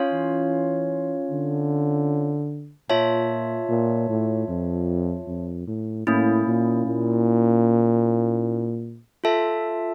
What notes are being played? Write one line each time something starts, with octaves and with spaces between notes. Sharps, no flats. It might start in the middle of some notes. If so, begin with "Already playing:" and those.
Already playing: C#4 F4 C#5 F5
E3
D3
A#2 F4 C#5 E5 A5
A#2
A2
F2
F2
A2
A2 A#3 C#4 E4
A#2
A#2
F4 A4 E5 A5